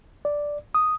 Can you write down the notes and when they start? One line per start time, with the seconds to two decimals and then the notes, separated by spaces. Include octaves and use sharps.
0.25 D5
0.75 D#6